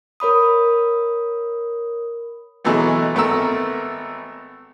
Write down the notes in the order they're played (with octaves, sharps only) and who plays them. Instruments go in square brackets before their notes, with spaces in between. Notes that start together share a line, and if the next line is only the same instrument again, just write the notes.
[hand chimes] A#4 C#5 B5 D#6
[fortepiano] B2 E3 F#3 G#3 A3 B3
G#1 A3 B3 A#4 E6